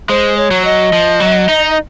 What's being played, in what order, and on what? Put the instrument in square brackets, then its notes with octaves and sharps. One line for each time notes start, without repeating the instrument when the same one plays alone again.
[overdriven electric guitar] G#3 [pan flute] C5
[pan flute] C#5
[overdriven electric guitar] F#3
[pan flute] D#5
[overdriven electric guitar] F3
F#3
D#4